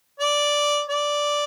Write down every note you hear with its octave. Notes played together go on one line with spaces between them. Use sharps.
D5
D5